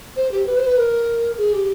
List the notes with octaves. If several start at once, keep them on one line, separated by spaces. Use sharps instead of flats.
C5
G4
B4
C5
B4
A#4
G#4
G4